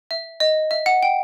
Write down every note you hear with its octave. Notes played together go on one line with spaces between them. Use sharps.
E5
D#5
E5
F#5
G5